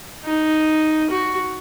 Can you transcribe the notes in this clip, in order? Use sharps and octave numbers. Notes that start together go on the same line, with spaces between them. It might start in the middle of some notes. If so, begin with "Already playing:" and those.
D#4
F#4